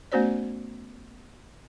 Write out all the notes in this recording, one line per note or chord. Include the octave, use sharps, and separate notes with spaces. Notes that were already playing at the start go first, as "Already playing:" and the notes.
A3 B3 C#4 F#4 C5 D5